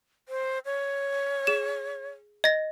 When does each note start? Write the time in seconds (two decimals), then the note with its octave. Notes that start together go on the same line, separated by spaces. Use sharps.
0.29 C5
0.65 C#5
1.47 G#4 E7
2.44 D#5 A#6